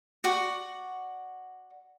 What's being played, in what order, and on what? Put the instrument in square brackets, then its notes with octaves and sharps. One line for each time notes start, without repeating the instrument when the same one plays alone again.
[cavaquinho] F#4 D5 F#5 C#6